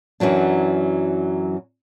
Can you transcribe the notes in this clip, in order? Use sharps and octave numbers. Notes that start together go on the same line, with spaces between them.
F#2 E3 F#3 D4